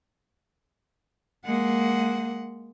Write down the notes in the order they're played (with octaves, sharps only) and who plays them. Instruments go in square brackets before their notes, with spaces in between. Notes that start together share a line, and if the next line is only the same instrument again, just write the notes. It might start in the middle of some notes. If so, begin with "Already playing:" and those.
[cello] G#3 F#5 [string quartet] A#3